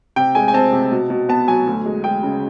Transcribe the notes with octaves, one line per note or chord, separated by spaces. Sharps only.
C3 G5
G#3 G#5
G#5
C4 A5
C3
B2
B2
B3 A5
F#3 G#5
D2
G#3
G#3 G5
C#3